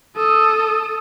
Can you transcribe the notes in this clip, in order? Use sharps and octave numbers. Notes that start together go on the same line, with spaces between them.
A4 D#6